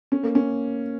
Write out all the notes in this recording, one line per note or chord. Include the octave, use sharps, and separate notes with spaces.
C#4
A#3
C#4